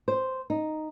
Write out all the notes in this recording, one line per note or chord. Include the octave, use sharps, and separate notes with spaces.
C5
D#4